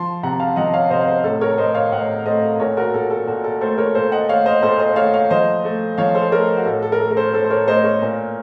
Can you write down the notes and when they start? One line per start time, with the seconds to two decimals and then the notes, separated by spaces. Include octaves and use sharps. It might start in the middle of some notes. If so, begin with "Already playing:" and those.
Already playing: F3 A5 C6
0.23 C3 F#5 A#5
0.39 F5 A5
0.56 F3 D#5 F#5
0.73 C#5 F5
0.90 C3 C5 D#5
1.01 F5
1.07 C5 D#5
1.24 A2 A4
1.41 A#4 C#5
1.58 A2 C5 D#5
1.75 C#5 F5
1.92 A2 D#5 F#5
2.26 A3 C5 D#5
2.60 A#2 A#4 C#5
2.77 F#4 A#4
2.94 A#2 A4
3.10 A4
3.27 A#2 F#4
3.44 A4
3.61 A3 A4 C5
3.78 A#4 C#5
3.95 A#2 A4 C5
4.12 D#5 F#5
4.29 A3 C#5 F5
4.46 C5 D#5
4.62 A#2 A4 C5
4.79 C5 D#5
4.96 A3 C#5 F5
5.14 C#5 F5
5.30 F3 C5 D#5
5.65 A3
5.98 F3 C#5 F5
6.15 A4 C5
6.32 A3 A#4 C#5
6.57 F#4
6.65 A2 A4
6.82 A4
6.92 A#4
7.00 A3 A4
7.11 A#4
7.17 A4 C5
7.33 A2 A4 C5
7.44 C5
7.50 A#4 C#5
7.68 A3 C5 D#5
7.84 A#4 C#5
8.02 A#2